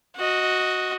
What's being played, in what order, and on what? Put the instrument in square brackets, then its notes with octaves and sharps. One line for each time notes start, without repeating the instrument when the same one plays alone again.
[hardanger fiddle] F#4 D#5